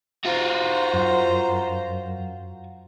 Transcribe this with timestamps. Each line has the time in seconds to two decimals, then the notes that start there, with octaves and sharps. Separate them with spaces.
0.25 F4 F#4 C5 A#5
0.93 F#2